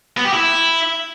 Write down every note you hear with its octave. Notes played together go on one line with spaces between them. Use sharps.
B3
G4
E4